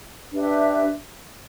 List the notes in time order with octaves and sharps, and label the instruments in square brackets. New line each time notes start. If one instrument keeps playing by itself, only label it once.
[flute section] D4 G4 B4 E5